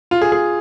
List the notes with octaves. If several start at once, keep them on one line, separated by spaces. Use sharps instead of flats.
F4
G#4
G#4